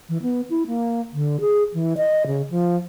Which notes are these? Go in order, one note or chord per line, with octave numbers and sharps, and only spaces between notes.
E3
B3
E4
A#3
D3
G#4
E3
D#5
C#3
F3